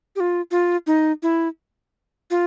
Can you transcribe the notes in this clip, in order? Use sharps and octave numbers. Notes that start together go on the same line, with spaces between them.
G4
F4
F4
D#4
E4
F4